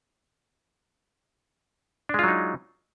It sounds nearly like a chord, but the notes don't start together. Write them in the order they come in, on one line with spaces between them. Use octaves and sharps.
D4 G#3 F4 F#3 D#4